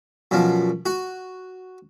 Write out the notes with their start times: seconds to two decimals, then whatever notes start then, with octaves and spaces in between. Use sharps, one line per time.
0.31 F#2 B2 F3
0.86 F#4